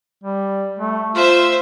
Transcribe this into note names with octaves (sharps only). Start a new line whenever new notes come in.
G3
A3
F4 C5 E5